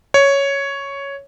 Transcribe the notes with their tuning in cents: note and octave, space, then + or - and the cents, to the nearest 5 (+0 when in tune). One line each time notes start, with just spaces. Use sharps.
C#5 +5